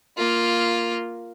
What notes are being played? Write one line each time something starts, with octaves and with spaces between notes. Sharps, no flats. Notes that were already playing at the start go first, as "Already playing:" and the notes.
A#3 F4